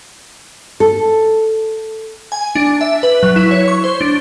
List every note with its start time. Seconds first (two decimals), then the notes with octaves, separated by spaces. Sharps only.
0.80 A4
2.32 G#5
2.55 D4
2.81 E5
3.03 B4
3.23 F#3
3.36 E4
3.51 C#5
3.68 C#6
3.84 C5
4.01 D4